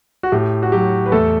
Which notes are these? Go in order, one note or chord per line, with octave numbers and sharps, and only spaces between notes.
F#4
A2 G4
F#4
F#3 G4
B4
E2 A3 A4